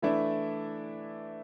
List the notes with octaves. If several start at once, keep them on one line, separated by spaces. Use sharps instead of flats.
E3 A3 D4 E4 E5